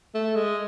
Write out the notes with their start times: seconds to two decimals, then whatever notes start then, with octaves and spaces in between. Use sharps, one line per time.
0.14 A3
0.35 G#3